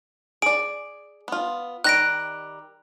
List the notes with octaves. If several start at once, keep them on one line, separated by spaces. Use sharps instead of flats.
G#4 D5 D7
B3 F4
D#3 G3 F#6 A#6 D7